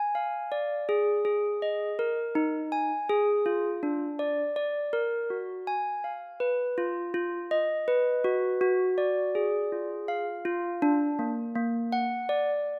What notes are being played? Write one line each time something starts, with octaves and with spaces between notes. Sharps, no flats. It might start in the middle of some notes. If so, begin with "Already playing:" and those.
Already playing: G#5
F5
D5
G#4
G#4
D#5
A#4
D#4
G#5
G#4
F4
D4
D5
D5
A#4
F#4
G#5
F5
B4
F4
F4
D#5
B4
F#4
F#4
D5
G#4
F4
F5
F4
D4
A#3
A#3
F#5
D5